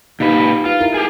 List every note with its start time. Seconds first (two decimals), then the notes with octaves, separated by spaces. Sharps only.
0.20 A#2 D#4 G4 B4 F5
0.65 F4 B4
0.81 E4 A#4
0.94 G4 G#4